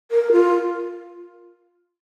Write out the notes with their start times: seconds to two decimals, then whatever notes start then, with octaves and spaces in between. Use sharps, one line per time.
0.11 A#4
0.32 F4